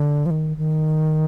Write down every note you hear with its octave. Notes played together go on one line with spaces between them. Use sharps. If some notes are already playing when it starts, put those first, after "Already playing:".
Already playing: D3
F3
D#3
D#3